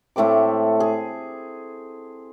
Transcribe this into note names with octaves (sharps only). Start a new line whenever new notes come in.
A2 A3 C4 D6
G#4